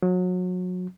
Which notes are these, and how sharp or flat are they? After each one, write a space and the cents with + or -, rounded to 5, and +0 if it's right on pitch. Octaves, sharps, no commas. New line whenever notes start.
F#3 -30